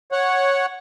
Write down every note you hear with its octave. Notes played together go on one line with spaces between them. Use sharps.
C#5 F#5